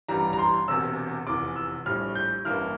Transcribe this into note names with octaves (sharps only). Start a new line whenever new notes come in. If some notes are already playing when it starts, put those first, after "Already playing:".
A1 G2 E3 G3 A#5
A#5
C6
E1 E2 C3 E6
F1 E2 E3 D6
E6
A#1 A2 G3 F6
G6
A1 G2 E3 A#3 E4 F6